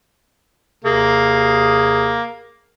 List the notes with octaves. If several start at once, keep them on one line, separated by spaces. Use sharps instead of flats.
D#2 C3 A#3 G#4